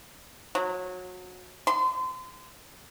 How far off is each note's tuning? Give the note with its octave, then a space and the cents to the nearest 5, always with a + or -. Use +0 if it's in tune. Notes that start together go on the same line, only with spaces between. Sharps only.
F#3 -25
C6 -35